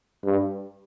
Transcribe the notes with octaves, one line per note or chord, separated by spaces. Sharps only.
G2